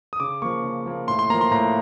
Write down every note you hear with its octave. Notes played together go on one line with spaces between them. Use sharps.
D#6
C#3 D6
F3 A#3 C#6
C#3
F3 A#3
A2 C6
C6
F3 A#3 A#5
C6
A2 A#5